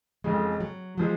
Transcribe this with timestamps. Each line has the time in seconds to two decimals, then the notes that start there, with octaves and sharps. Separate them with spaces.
0.24 F1 F2 C#3 G#3
0.60 F#3
0.98 F3 F#3 G#3